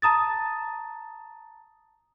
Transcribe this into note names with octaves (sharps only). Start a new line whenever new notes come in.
A5 A#5 D#6 A6